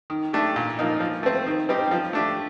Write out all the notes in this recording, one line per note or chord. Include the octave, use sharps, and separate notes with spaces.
D#3
A3 D4 G4
A#2
F3 A#3 D#4
F3
A3 C4
D#3
G3 C4 D#4 G4
F3
A3 D4 G4